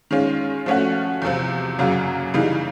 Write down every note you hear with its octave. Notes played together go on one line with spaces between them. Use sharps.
D#3 G#3 C#4 F4
F3 A3 C#4 F#4
E2 C3 F3
F#2 C#3 F#3 A#3
C#3 E3 G3 A#3 D#4